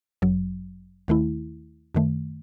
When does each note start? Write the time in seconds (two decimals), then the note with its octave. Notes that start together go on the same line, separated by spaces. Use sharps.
0.22 G1 F#2 F#3
1.08 D#2 D#3 A3 E4
1.95 F#2 D#3 A3